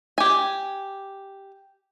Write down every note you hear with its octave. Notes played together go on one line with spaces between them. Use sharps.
G4 G#5